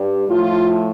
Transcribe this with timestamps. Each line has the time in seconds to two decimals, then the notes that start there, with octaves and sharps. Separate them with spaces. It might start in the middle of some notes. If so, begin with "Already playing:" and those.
Already playing: G2 G3
0.29 A2 F3 A3 F4